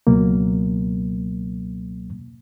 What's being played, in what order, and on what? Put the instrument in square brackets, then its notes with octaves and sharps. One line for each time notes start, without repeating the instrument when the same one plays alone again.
[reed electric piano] C#2 B2 F#3 A#3